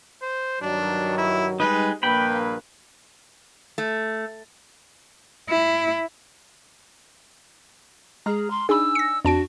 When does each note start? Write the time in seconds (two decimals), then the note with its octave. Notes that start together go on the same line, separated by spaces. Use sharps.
0.22 C5
0.61 G2 D#3 F#3 D4
1.18 E4
1.60 G3 G#3 D#4 B4
2.03 A#1 G2 A#3 B4 G5 B5
3.78 A3
5.49 E4
8.26 G#3 G#4 A#5 F6
8.50 C6
8.69 D4 D#4 G#4 G#5 B5 E6
8.95 A#6 C#7
9.24 F2 D4 F#4 A5 D7